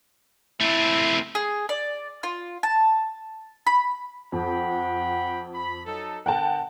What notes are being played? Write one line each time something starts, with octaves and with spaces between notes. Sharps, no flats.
A3 C4 E4
G#4
D5
F4
A5
B5
F2 F#5 G5 B5
B5
F#3 D#4 A4
D3 B3 A#4 F#5 G5 A5